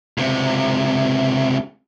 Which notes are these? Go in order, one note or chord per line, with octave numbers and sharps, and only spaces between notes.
C#2 C3